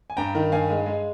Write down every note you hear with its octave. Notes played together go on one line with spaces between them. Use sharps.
G#5
G2 G5 A#5
D#3
G2 F5 G#5
G#3
G#3